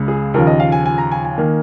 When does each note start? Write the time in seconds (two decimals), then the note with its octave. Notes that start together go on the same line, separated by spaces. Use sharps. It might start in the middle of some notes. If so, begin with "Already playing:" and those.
Already playing: C#2 C#3 G#3
0.08 G#4
0.34 D#2 C#3 F3 A#4
0.47 D#5
0.60 F5
0.72 G#5
0.86 G#5
0.98 A#5
1.12 G#5
1.25 G#5
1.38 D#3 A#3